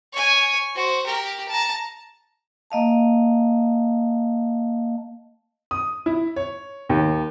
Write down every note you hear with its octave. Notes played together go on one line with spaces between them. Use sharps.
C#5 G#5
F#4 C5
G4 A#4
A5 A#5
A#3 D#5 F5 A5
D#6
E4
C#5
D#2